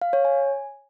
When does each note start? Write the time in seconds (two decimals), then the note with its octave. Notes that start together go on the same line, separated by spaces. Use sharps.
0.02 F5
0.13 C#5
0.25 G#5